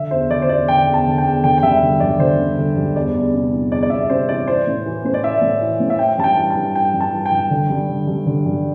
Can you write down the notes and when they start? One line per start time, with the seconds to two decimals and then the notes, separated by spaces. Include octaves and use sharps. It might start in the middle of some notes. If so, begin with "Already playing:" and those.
Already playing: D3 E5
0.11 E2 C5
0.30 D3 D5
0.42 C5
0.49 E2 D5
0.68 D3 G5
0.87 E2
0.94 A5
1.06 D3
1.18 G5
1.25 E2
1.44 D3 G5
1.58 G5
1.63 G2 E5
1.82 D3
2.00 G2 D5
2.19 D3 C5
2.39 G2
2.58 D3
2.77 G2
2.95 E2 D5
3.14 E2
3.34 C3
3.52 E3
3.72 E2 D5
3.83 D5
3.90 E2 E5
4.09 C3 C5
4.28 E3 D5
4.48 E3 C5
4.67 A2
4.86 E3
5.05 A2 C5
5.14 D5
5.23 E3 E5
5.42 A2
5.61 E3
5.80 A2
5.90 E5
5.99 E3 G5
6.18 G2 A5
6.24 G5
6.37 E3
6.50 A5
6.56 G2
6.74 E3 G5
6.94 G2
7.00 A5
7.13 E3
7.26 G5
7.31 G2
7.50 D3
7.70 G2
7.89 D3
8.08 G2
8.27 D3
8.46 G2